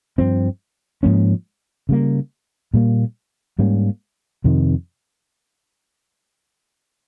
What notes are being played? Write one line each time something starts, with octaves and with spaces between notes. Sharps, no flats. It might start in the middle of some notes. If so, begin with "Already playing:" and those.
G2 F3 C4
G#2 F3 A#3 C#4
C#3 G3 A#3
A#2 G3 A#3
G#2 G3 A#3 C#4
F2 C3 D#3